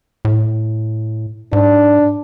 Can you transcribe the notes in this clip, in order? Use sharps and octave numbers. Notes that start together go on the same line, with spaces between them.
A2
G#2 D4